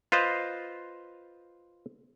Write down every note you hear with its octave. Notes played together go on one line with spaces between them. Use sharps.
F4 B4 C5 D#5 F5